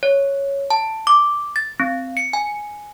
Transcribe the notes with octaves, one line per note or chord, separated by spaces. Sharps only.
C#5
A5
D6
A6
C4
C#7
G#5